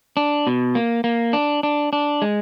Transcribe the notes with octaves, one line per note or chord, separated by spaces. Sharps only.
D4
B2
A#3
A#3
D4
D4
D4
G#3